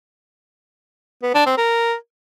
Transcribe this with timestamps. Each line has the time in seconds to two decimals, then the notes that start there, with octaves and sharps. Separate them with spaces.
1.23 B3
1.34 D4
1.46 C4
1.58 A#4